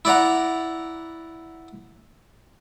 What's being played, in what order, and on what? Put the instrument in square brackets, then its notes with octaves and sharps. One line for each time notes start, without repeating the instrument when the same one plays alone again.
[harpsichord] E4 D5 F#5 A#5